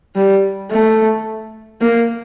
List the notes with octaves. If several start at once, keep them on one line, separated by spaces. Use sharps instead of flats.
G3
A3
A#3